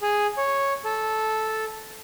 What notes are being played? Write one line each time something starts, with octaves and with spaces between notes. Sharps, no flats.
G#4
C#5
A4